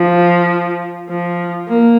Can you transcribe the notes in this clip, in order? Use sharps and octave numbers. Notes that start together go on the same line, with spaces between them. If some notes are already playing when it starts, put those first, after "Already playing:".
Already playing: F3
F3
A#3